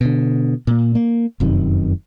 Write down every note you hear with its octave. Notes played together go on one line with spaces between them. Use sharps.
B2 D3
A#2 A#3
A#3
F1 F#2 C3 D#3